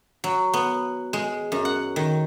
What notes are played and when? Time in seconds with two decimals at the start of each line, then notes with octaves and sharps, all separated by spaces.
0.24 F#3
0.54 B3
1.13 G#3
1.52 F#2
1.65 F#5
1.96 D#3